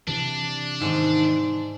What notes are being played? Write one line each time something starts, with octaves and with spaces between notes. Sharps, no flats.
C3 E3 D4
G#2 D#3 G#3 A3